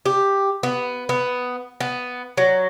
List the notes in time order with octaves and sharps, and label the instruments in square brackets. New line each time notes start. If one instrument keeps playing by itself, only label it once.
[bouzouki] G4
B3
B3
B3
F#3